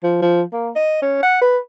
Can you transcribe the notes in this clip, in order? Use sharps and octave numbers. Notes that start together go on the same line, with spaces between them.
F3
F3
A#3
D#5
C#4
F#5
B4